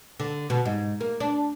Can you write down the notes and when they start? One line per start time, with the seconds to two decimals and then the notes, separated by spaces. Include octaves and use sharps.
0.20 D3
0.50 B2
0.65 G#2
1.01 A#3
1.20 D4